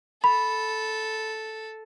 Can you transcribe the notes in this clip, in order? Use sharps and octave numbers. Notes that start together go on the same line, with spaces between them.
A4 B5